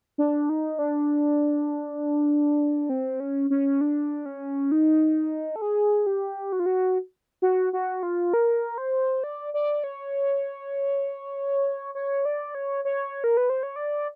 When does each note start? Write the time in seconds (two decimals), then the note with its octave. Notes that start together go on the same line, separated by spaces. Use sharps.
0.18 D4
0.49 D#4
0.79 D4
2.89 C4
3.20 C#4
3.50 C#4
3.81 D4
4.26 C#4
4.72 D#4
5.56 A4
5.62 G#4
6.07 G4
6.52 F#4
6.60 F4
6.66 F#4
7.42 F#4
7.73 F#4
8.03 F4
8.34 A#4
8.78 C5
9.24 D5
9.54 D5
9.84 C#5
11.95 C#5
12.25 D5
12.55 C#5
12.85 C#5
13.24 A#4
13.37 B4
13.50 C5
13.63 C#5
13.76 D5